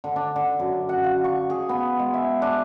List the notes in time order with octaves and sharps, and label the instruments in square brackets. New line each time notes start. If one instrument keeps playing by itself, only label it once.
[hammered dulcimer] D3
D4
D3
F#2
F#5
F5
C#6
G#4
B3
G#3
E5
D4